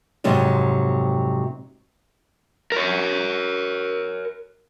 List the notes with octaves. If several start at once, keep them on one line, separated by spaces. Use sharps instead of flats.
F2 G#2 C3 F#3 G#3
A#4 C#5